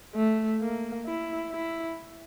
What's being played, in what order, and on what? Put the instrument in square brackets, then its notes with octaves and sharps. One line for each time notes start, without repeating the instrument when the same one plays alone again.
[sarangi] A3
A#3
E4
E4